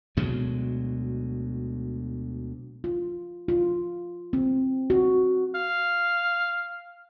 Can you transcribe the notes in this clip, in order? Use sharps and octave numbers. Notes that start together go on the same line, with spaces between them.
D2 B2 F#3 G#3
F4
F4
C4
F#4
F5